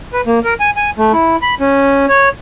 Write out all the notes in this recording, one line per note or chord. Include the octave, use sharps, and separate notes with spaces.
B4
A#3
A#4
G#5
G#5
A3
E4
B5
C#4
C#5